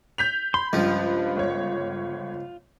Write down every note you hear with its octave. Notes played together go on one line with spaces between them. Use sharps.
G6 B6 F7
B5 C6
C#2 G2 F3 F4
G1 C#5